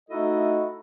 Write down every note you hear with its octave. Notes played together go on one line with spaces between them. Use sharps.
A3 D#4 E4 F#4 A4 D#5